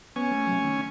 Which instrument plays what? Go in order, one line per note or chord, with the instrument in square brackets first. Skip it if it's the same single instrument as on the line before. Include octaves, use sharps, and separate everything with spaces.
[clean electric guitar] B3 [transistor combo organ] C#4 G#5
[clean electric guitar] A3
C3 E3 F#3
D#3 A3